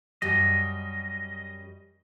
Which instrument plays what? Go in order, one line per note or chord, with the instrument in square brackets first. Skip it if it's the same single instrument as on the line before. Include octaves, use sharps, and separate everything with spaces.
[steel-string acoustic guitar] F#2 G3 [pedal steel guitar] D#5